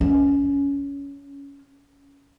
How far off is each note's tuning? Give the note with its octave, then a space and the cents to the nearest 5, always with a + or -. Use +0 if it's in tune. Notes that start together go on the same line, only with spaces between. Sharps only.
C#4 +15